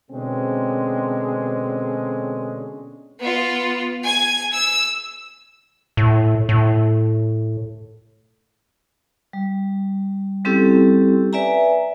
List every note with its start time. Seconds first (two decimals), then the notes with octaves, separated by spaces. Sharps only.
0.10 B2 D3 G#3 C4 C#4
3.20 B3 F4
4.03 G#5 G#6
4.52 E6
5.97 A2
6.49 A2
9.33 G3
10.45 G3 C4 C#4 E4 G4 A4
11.33 B4 D5 E5 G#5 A#5